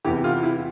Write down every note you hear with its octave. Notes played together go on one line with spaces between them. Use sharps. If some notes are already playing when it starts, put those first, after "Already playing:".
E2 C3 E3 G4
F4
E4